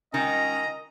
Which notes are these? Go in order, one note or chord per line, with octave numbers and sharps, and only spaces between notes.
D#3 C#4 D#5 A#5